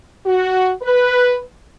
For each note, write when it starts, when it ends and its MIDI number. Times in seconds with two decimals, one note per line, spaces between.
0.25 0.72 66
0.82 1.39 71